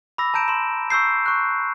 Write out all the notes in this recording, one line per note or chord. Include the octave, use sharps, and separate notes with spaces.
B5 D6 E6 A#6
A5 A#5 G6 D7 E7
C6 E7
C#6 E6 G6 C7
C#6 F#6